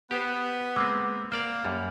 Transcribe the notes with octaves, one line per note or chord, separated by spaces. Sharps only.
B3 G4 C5
G#3 A#3 C4 D6 E6
A#3 C5 D5 F5 F6
F#2 G3